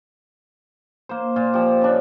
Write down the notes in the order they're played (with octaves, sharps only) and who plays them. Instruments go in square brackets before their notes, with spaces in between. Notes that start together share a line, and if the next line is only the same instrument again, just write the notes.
[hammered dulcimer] A#3 C5
A#2 F4
F3 G4
C#3 D4